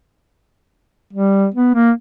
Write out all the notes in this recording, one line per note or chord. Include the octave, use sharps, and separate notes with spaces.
G3
B3
A#3